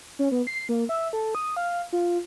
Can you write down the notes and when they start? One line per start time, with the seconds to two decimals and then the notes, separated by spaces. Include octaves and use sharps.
0.19 C#4
0.32 B3
0.47 C7
0.69 A#3
0.89 E5
1.13 A4
1.35 D#6
1.57 F5
1.93 F4